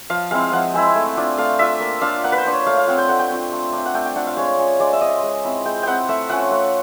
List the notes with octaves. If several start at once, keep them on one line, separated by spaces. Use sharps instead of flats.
F3 F5
G#3 C4 E4 F5
F3 F#5
G#3 C4 E4
A3
D4 F4
A3 F5
D4 F4 E5
A#3
D4 F4 F5
A#3 F#5
B4
C5
D4 F4
C#5
A3 F5
F5
C4 F4 F#5
G5
A3 F#5
G5
C4 F4
A3
D4 F4
F#5
A3 G5
G5
D4 F4 F#5
F5
G#3 C#5
C#4 F4
G#3 D5
E5
C#4 F4 D#5
G#3
C4 E4
G#3 G5
C4 E4 F#5 G5
A3 E5
C#4 F4 F#5
A3